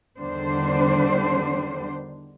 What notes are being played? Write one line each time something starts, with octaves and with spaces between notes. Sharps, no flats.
E2 D3 D#3 G3 D4 C5